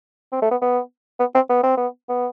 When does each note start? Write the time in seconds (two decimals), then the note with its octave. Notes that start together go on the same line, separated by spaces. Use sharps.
0.32 C4
0.42 A3
0.51 B3
0.61 B3
1.20 B3
1.35 C4
1.49 B3
1.63 C4
1.77 B3
2.09 B3